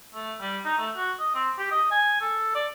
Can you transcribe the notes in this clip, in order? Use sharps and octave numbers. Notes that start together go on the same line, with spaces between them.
A3
G3
D#4
A3
F#4
D#5
C4
G4
D#5
G#5
A4
D5